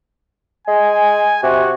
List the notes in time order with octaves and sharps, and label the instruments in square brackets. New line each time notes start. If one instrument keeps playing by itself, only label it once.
[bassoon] G#3 [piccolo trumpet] G#5
[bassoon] C3 [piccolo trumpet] F#4